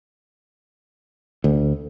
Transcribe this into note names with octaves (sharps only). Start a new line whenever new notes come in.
D2